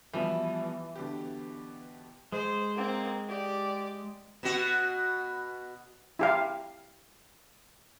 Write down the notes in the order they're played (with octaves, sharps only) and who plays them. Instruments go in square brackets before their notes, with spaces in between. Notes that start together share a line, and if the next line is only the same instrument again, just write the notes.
[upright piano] B2 F3 G3 [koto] E3
[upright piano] B2 D3 G4
[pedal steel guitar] G#3 [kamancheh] C5
[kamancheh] A#3 C4
G4 D5
[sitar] B2 F#4
[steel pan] E4 G4 F5